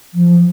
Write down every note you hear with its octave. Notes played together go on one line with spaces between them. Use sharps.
F3